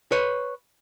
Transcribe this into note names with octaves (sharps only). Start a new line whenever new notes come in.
B4 C#5